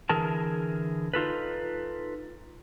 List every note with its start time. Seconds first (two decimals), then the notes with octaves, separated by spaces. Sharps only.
0.09 D3 E3 G#4 A#4 A5
1.13 D#4 F4 A4 B4